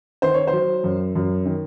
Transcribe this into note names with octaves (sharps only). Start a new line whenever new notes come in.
D#3 C5
C#5
F#3 C5
F#2
F#2
D#3